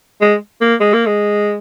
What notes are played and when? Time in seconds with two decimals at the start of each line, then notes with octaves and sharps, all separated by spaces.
0.21 G#3
0.61 A#3
0.80 G#3
0.93 A#3
1.06 G#3